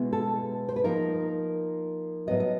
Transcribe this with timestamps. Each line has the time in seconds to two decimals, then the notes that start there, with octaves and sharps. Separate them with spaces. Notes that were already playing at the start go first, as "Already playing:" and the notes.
Already playing: B2 G#3 B3 E4
0.13 A4
0.69 C5
0.76 B4
0.84 F3 A#3 D#4 A#4
2.27 A2 F#3 B3 D#5
2.40 D#5